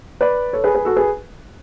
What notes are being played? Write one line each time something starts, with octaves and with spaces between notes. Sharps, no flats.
B4 D5
A4 C#5
G#4 B4
G#4 B4
F#4 A4
G#4 B4